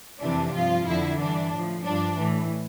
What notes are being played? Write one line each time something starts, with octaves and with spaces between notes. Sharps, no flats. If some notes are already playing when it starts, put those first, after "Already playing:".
F2 C3 E3 D4
G2 F3 F4
F2 D3 F3 E4
G2 E3 D4
A2 F3
G2 F3 D4
A2 E3